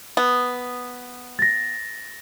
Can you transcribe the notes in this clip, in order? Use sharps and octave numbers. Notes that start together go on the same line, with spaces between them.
B3
A6 A#6